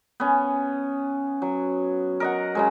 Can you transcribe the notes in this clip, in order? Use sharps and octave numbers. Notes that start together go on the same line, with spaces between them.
B3 C#4
F#3
A#4 D#5 F#5
C#3 F#3 G#3